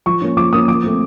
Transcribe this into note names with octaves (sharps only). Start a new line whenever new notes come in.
F3 C#6
A#3 C#4
F3 D6
A#3 C#4 D#6
F3 D6
A3 C4